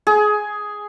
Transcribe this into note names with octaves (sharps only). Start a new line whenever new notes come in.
G#4